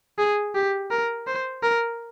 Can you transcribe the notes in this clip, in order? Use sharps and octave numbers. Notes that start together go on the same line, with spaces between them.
G#4
G4
A#4
C5
A#4